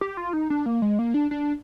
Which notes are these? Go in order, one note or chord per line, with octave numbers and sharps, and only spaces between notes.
G4
F4
D#4
D4
A#3
G#3
A#3
D4
D4